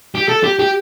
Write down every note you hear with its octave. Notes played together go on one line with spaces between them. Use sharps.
G4
A4
G4
G4